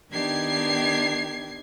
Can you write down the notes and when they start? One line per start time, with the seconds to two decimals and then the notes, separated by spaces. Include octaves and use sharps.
0.13 D#3 B3 D4 G4 G#6 C7